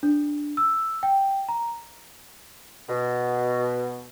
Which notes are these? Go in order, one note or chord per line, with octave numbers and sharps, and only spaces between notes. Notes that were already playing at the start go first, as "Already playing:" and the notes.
D4
E6
G5
A#5
B2